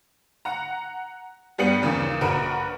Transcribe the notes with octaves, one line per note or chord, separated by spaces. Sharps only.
F#5 A#5
G2 G3 B3 G5 C#7 F#7
D#2 C#3 E3 F3 A#3
A#1 F#4 A#4 B4 D7